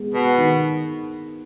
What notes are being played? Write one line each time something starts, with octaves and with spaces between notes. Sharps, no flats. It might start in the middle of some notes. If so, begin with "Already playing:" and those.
Already playing: G#3 B3
B2
D#3